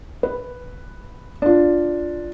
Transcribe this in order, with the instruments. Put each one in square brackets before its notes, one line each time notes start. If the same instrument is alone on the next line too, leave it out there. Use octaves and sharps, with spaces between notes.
[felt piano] B4
D4 F4